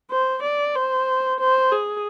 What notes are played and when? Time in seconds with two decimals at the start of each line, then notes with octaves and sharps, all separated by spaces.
0.11 C5
0.43 D5
0.76 C5
1.40 C5
1.72 G#4